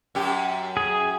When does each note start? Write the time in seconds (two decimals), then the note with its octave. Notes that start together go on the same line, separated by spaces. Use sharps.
0.15 F#2 G4
0.77 G#4